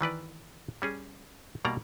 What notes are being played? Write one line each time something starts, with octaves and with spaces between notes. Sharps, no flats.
D#3 E3 B4 D5
G3 C#4 G#4
B2 G3 A#3 D#4 D5 A#5